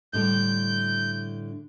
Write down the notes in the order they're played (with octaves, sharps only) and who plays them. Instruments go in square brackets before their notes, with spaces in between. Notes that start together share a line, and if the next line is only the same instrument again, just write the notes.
[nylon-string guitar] A2 D3 G3 [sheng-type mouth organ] G6